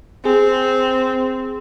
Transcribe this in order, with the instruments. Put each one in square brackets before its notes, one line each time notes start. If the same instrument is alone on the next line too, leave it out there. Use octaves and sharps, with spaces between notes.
[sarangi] C4 [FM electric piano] G#4